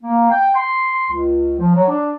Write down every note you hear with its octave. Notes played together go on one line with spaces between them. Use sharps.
A#3
G5
C6
C#2
F3
F#3
D4